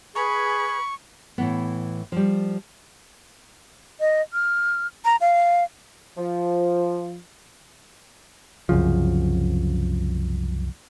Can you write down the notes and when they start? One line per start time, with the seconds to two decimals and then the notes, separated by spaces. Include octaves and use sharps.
0.15 G#4 B4 B5 C#6
1.38 A2 E3 B3
2.12 F3 G3
4.00 D#5
4.33 F6
5.05 A#5
5.21 F5
6.18 F3
8.69 C2 F#2 C#3 F3